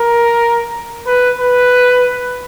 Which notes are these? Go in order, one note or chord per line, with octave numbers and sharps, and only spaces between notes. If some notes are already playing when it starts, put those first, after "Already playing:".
Already playing: A#4
B4
B4